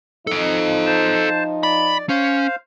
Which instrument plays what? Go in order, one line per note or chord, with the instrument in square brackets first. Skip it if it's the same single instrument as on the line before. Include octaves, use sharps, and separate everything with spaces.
[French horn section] F3 D#4 [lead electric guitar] A4 D#5
[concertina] C5 A5
[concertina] D5 [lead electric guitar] B5
[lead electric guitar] C#4 [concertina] C5 F5